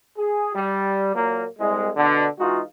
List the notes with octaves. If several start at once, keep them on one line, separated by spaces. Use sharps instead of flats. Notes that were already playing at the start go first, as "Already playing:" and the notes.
G#4
G3
A#2 F#3 A#3
C2 G#3
B2 D3
E3 G#3 D#4 F4 F#4